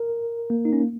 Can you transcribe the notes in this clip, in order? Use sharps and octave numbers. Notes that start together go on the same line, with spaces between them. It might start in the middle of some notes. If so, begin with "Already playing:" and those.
Already playing: A#4
A#3
D#4
C#4
A#3